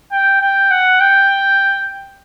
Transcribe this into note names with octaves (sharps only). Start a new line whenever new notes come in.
G5
G5
F#5
G5